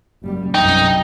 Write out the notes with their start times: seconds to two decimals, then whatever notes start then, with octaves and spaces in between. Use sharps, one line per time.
0.23 F#1 G3
0.54 B1 F#2 C3 D#4 G5